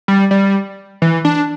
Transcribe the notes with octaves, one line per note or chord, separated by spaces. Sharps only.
G3
G3
E3
D4